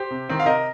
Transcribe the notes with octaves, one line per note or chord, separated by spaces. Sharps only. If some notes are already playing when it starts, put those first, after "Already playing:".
Already playing: G4 C5
C3
D#3 C4 D#4
F5
C3 A#4 D#5